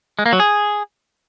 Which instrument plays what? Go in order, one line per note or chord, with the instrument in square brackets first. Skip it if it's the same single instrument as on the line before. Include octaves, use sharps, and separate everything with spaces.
[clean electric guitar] G#3
A#3
F#3
G#4